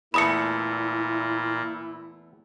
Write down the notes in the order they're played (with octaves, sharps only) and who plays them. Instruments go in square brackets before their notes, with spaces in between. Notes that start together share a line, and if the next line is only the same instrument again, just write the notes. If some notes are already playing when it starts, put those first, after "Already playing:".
[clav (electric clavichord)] E2 A3 [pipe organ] A#2 [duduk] E4 [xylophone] B5 D#6 C#7